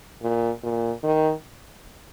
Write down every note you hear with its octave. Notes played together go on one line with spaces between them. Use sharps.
A#2
A#2
D#3